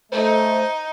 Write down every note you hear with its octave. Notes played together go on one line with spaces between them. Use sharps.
A3 D#4 C5